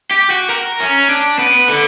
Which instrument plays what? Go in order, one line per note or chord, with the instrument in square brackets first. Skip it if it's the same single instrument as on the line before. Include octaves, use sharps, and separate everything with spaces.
[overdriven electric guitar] G4
F#4
A#4
C#4
D4
B3
D3